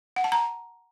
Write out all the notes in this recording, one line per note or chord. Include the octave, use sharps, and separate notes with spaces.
F#5
A5
A#5